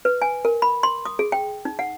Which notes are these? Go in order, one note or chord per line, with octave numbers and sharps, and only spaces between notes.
B4
G#5
A#4
B5
C6
D#6
G#4
G5
D#4
F#5